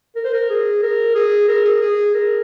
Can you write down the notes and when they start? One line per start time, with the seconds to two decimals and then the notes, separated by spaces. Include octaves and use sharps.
0.16 A#4
0.24 C5
0.33 A#4
0.50 G#4
0.83 A#4
1.15 G#4
1.48 A#4
1.65 G#4
1.82 G#4
2.14 A#4